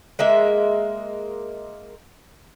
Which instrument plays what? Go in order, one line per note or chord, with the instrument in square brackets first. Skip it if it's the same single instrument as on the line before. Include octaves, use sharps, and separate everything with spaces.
[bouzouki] G#3 A#3 E5